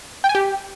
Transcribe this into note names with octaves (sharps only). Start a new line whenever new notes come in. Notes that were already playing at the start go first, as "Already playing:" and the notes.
G5
G#5
G4